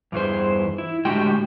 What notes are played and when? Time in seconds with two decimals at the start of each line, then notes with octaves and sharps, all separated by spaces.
0.12 E2 G2 E3 G#4 C5
0.78 E4
1.05 A2 D3 G#3 F#4 G4 G5